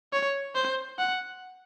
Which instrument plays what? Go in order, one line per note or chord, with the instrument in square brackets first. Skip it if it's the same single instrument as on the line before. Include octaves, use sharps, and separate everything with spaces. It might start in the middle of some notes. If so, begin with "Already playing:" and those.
[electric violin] C#5
C5
F#5